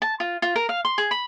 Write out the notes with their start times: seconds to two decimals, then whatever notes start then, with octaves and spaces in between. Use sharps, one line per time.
0.02 A5
0.20 F4
0.42 F4
0.55 A#4
0.69 F5
0.85 C6
0.98 G#4
1.11 B5